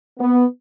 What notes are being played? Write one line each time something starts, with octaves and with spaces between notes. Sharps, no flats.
B3